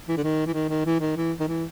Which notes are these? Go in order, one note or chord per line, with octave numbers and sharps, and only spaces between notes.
E3
D3
D#3
E3
D#3
D#3
E3
D#3
E3
D#3
E3